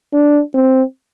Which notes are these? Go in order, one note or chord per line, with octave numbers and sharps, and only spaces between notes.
D4
C4